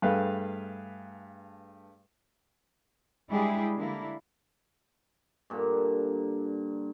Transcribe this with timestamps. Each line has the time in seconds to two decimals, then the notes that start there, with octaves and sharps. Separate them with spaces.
0.02 G2 A3 G#4 B4 F5 G5
3.30 G3 G#3 D4 E4 G4 G#4
3.77 D3 A#3 E4
5.50 G2 A#2 D3